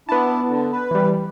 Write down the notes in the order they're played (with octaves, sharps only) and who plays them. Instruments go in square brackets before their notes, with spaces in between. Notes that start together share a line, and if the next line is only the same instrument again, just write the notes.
[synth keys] B3 A5 [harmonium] D4 E4
[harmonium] D3
B4
[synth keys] E3 G3